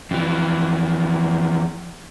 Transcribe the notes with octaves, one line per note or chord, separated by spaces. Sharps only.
F2 E3